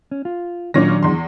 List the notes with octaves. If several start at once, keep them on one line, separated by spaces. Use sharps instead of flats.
C#4
F4
A#2 D#3 F#3 C#4 D4 A#6
E2 C6